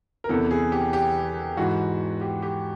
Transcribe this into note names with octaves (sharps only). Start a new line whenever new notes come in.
A#4
E2 C3 E3 A4
G#4
G4
G4
G#2 E3 F#4
G4
G4